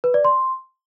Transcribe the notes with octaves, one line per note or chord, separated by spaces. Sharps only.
B4
D5
C6